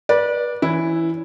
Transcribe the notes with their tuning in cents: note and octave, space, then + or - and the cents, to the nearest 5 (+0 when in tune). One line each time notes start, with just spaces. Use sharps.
B4 -30 D5 +0
E3 +0 C#4 +15 E4 +0